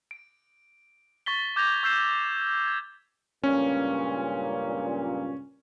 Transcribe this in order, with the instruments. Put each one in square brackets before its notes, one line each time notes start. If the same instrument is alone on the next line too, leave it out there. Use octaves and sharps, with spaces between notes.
[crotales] D7
C#6 A6 B6 G7
D6 G6 G#6 A#6 F7
C#6 E6 G6 C7 E7
G#6
[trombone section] C#2 G2 A#2 [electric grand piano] C#4